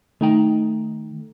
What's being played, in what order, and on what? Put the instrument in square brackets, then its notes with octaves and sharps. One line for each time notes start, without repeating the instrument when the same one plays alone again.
[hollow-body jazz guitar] D#3 D#4 G5 [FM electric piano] A3